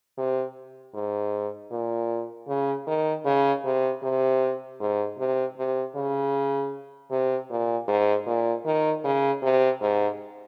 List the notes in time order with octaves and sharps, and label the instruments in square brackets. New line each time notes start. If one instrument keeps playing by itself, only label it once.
[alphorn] C3
G#2
A#2
C#3
D#3
C#3
C3
C3
G#2
C3
C3
C#3
C3
A#2
G#2
A#2
D#3
C#3
C3
G#2